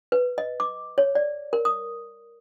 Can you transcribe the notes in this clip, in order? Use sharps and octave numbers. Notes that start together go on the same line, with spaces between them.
B4
D#5
D6
C#5
D5
A#4
D#6